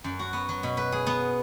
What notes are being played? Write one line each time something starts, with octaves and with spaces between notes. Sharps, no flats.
F#2
F#4
B3
F#3
B2
B4
G#4
B3